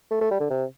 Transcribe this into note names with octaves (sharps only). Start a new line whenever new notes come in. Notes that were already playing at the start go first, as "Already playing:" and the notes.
A3
A3
G3
D3
C3